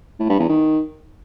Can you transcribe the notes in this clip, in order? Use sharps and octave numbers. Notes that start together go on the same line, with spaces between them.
A2
G2
E2
D#3